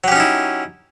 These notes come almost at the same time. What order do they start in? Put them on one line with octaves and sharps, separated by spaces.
F#3 G4 C#4 D#4 E4